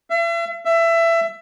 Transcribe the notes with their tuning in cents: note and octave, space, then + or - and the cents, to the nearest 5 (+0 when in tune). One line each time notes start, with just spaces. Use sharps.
E5 +40
E5 +20